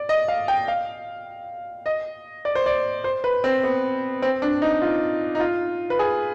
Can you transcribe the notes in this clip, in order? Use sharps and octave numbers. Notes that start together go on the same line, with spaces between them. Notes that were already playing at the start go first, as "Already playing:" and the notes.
Already playing: D5
D#5
F5
G5
F5
D#5
D5
C5
D5
C5
B4
C4
B3
C4
D4
D#4
F4
D#4
F4
B4
G#4